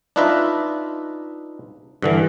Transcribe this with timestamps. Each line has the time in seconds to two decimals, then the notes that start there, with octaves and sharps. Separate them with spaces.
0.16 D4 D#4 F4 B4 D#5 E5
2.02 G2 D3 E3